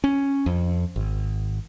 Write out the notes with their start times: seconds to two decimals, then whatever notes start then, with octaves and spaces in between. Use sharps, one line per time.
0.04 C#4
0.46 F2
0.96 G#1